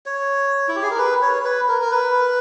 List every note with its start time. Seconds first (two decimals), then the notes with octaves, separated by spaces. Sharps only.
0.06 C#5
0.68 E4
0.76 G4
0.83 G#4
0.91 A#4
0.98 B4
1.22 C#5
1.44 B4
1.68 A#4
1.82 A#4
1.92 B4